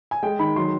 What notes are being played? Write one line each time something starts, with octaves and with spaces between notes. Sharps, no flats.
G#5
G#3 G5
D#3 B5
F#3 C6